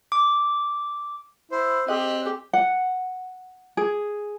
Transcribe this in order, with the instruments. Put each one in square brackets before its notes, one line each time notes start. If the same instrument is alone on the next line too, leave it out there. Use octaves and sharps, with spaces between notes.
[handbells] D6
[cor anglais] E4 [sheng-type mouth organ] C5
[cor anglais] C4 [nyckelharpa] G4 [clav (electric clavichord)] D#5 [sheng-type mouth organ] F#6
[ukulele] F#5
G#4